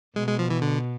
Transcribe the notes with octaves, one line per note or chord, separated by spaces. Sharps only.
B2 G#3
G#3
F3
E3
D3